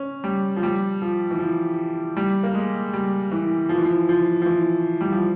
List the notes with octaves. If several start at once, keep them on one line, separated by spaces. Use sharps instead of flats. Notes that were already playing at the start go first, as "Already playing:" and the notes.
Already playing: C#4
G3
F3
G3
F3
E3
F3
G3
A#3
G#3
G3
E3
F3
E3
F3
F3
F3
E3
G3
F3